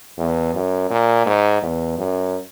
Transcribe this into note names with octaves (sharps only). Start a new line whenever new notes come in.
E2
F#2
A#2
G#2
E2
F#2